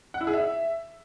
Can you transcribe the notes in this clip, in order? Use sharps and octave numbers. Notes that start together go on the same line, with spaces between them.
F#5
E4
G#4
E5